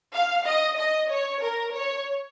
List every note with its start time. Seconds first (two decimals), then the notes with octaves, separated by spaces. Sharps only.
0.15 F5
0.46 D#5
0.78 D#5
1.10 C#5
1.41 A#4
1.74 C#5